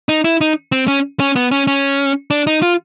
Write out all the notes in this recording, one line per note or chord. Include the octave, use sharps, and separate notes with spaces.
D#4
E4
D#4
C4
C#4
C#4
B3
C#4
C#4
D4
D#4
F4